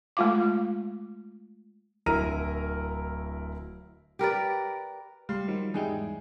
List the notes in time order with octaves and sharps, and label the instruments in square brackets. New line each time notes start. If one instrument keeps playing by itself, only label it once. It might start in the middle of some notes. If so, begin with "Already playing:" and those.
[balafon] G#3 A3 F4 F5 D6
[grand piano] D1 E4 A#4 A#5 D#7
[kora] G4 A#4 B4 D5
[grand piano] G3 [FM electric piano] F5 C6
[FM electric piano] D#3 F3 F#3
[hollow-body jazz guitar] E2 D#4 G5 [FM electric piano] G#2 G3 E4 [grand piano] G#4